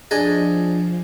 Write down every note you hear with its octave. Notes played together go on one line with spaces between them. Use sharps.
F3 D4 G#4 D#5